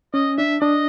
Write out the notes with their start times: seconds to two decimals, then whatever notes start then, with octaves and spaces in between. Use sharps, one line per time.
0.14 C#4 D#5
0.38 D4 E5
0.62 D4 D#5